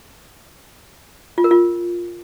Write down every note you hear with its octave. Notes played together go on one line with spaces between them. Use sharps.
F4
A#4
F4